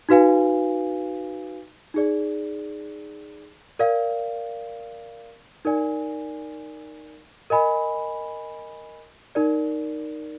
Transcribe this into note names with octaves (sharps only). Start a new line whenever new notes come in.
D#4 F#4 B4 F5 G#5
D#4 G#4 D5
A#4 D5 F5
D#4 A#4 D5 G#5
A#4 D#5 G#5 B5
D#4 A#4 D5